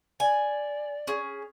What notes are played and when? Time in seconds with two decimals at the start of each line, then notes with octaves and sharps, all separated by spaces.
0.20 D5 G#5
1.07 C#4 G#4